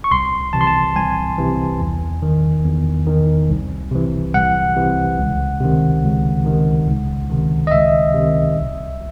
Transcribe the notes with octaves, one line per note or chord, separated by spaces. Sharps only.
C#6
C2 C6
C3 E3 A5
C6
A5
C2 G#5
C3 E3
E2
D#3
E2
D#3
C2
C3 E3
C2 F#5
C3 E3
C#2
C3 D#3
C#2
C3 D#3
C#2
C3 D#3
D#5
C#2 E5
C3 D#3
C2